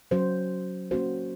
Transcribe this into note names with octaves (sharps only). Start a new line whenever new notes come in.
F#3 C#4 F#4 C5
A#3 C#4 F#4 C5